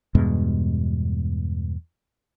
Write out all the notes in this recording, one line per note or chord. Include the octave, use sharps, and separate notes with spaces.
E2 G2 B2 G#3